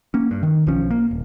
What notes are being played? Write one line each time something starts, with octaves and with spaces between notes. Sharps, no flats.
A#3 C#4
G2
D#3
B1 F3 C#4
A#3
D#1